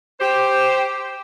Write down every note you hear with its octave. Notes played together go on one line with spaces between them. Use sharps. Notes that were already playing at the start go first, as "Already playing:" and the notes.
G4 C5